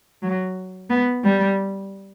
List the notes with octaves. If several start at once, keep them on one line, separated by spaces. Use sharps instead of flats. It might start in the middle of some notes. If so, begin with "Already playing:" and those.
F#3
B3
G3